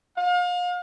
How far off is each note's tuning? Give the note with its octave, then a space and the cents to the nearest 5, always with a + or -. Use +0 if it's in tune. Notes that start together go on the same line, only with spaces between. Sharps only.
F5 +35